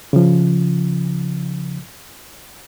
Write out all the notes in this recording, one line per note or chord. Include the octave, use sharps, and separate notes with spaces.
C#3 F3